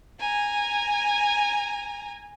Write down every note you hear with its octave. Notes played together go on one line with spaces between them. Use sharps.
G#5 A#5